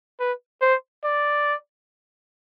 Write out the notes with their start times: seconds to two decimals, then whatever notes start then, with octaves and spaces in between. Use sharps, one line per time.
0.20 B4
0.61 C5
1.04 D5